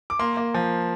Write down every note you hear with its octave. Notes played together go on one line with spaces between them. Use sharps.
D6
A#3 C6
A#3
F3